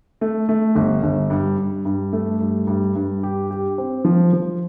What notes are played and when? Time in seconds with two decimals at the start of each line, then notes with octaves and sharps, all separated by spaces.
0.21 A3
0.49 A3
0.75 G1
1.03 G1
1.30 G2
1.59 G2
1.85 G2
2.13 A3
2.41 G2
2.67 G2
2.96 G2
3.23 G4
3.51 G4
3.78 C4
4.05 F3
4.33 F3